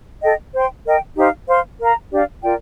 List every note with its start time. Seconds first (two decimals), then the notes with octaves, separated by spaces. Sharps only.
0.22 A4 D#5 G5
0.53 C5 G5 C6
0.85 A#4 D#5 G5
1.17 D#4 G4 C5 F5
1.48 C5 F5 C6
1.80 A#4 F5 A#5
2.11 D4 G4 D5 F5
2.42 F4 A#4 D5 G5